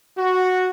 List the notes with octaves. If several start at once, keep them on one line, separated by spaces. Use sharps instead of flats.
F#4